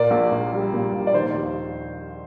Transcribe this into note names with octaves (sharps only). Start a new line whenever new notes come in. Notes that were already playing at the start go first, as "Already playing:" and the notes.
Already playing: A#2 A#3 D5
A#1
A#1
G3
A#2
A#1
D5
D#3 C5
D#2